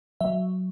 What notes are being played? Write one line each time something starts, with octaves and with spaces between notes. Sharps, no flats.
F#3 E5